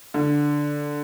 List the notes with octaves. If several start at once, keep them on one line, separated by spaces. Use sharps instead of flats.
D3